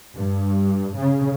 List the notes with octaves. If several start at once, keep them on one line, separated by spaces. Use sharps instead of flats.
G2
C#3